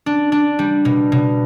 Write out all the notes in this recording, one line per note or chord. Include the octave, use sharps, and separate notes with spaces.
D4
D4
G3
B2
B2